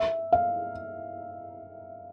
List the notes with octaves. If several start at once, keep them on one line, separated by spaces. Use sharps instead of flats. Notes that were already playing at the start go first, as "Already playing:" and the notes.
Already playing: E5
F5